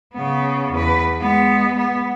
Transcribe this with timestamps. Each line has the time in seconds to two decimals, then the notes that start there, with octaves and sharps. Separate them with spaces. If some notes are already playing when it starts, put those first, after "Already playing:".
0.14 C#3 B3
0.72 E2 B4
1.20 G#3 B3
1.77 B3